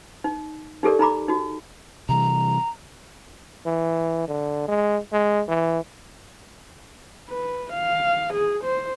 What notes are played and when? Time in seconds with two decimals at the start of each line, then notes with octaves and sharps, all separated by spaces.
0.24 D#4
0.83 D#4 G4 A4 A#4 D5
0.99 D#4 A#5 B5 D6
1.28 D#4 F#4
2.09 C3 E3 G3 A#5
3.66 E3
4.28 D3
4.68 G#3
5.12 G#3
5.48 E3
7.29 B4
7.73 F5
8.34 G#4
8.64 C5